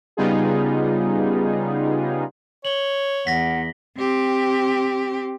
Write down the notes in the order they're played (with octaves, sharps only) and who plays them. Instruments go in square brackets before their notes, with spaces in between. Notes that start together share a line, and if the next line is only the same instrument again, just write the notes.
[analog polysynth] C#3 G3 B3 D#4 F4 G#4
[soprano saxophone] C#5 [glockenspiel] F#7 G7
[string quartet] E2 [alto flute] F#5 [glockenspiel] A#6 B6
[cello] C4 G4